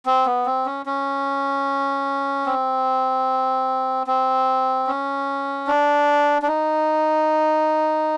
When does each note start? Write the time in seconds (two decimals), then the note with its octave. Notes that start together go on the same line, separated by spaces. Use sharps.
0.06 C4
0.26 B3
0.46 C4
0.66 C#4
0.86 C#4
2.46 C4
4.07 C4
4.87 C#4
5.67 D4
6.42 D4
6.47 D#4